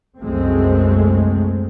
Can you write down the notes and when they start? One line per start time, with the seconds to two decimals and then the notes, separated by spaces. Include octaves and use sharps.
0.19 C2 F#2 G#3 A3 C4